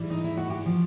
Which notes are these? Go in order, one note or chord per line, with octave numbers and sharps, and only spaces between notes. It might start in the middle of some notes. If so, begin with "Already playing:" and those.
Already playing: G#2 E3 G3
D#4
E4
F#4
G4
F3